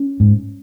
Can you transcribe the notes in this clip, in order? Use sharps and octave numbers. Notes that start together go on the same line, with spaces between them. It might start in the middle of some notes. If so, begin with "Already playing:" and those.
Already playing: C#4
G#2